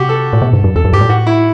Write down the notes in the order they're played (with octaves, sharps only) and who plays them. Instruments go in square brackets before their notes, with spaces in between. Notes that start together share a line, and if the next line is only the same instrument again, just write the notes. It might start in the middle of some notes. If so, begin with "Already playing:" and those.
Already playing: [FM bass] C3 [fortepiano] F#4 G4
[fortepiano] A4
[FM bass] A2
B2
G2
F#2
[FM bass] E2 [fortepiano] A4
[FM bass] F#2
[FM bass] G2 [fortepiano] G4
[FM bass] A2
[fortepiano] F#4
E4